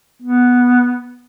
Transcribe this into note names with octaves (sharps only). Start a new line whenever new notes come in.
B3